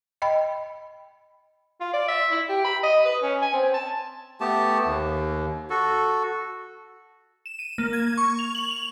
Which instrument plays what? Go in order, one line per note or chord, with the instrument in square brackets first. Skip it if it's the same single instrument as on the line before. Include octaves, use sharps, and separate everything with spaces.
[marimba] D#5 G5 B5
[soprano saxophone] F4
D5
E5
E4
G4
B5
D#5
B4
C#4
G#5
C4
A5
[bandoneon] A3 B3 G4 A5
D#2
F#4 A4
[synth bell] E7
D#7
A#3
G#6
C#6
F7
F#7
F7